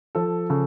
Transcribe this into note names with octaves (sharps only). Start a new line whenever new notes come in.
F3 A4
C#3 A4